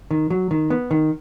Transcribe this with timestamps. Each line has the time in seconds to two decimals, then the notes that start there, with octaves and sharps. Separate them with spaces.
0.11 D#3
0.30 F#3
0.51 D#3
0.70 B3
0.91 D#3